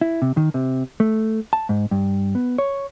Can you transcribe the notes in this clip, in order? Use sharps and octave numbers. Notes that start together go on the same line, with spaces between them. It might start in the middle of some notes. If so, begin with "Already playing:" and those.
E4
C3
D#3
C3
A3
A5
G#2
G2
B3
C#5